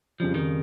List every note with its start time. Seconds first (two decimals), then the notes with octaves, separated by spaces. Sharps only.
0.20 F2 C#3 F3 G3
0.35 D#3